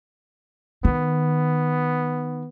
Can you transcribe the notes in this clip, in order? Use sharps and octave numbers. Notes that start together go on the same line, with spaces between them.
D#3 B3